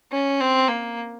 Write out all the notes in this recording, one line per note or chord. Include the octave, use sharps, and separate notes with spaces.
C#4
C4
A#3